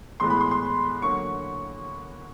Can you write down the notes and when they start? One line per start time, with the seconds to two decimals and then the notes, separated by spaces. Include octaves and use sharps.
0.20 A2 E3 G#3 B3 C6
0.30 B5
0.41 C6
0.51 C6
1.02 D3 F#3 A#3 C#6